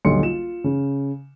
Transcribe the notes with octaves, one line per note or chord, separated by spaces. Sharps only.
D#1 B1 D3 C6 C#7
F4 E7
C#3